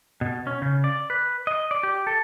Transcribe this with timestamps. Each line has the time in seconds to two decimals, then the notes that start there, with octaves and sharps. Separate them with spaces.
0.21 B2
0.47 C#4
0.62 C#3
0.84 D5
1.10 B4
1.47 D#5
1.71 D5
1.83 G4
2.07 A4